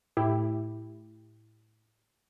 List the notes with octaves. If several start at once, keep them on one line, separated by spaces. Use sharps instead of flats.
A2 E4 G4